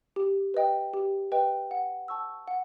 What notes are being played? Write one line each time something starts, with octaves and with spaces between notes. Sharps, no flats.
G4
B4 D#5 G5
G4
B4 D#5 G5
F#5
A5 C#6 E6
F#5